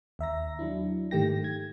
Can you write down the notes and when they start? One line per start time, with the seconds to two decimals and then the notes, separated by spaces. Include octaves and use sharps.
0.19 D#2 E5 A#5 A#6
0.59 F#3 D4 E4
1.11 G#2 D#3 A3 G4 G5 A#6
1.44 G#6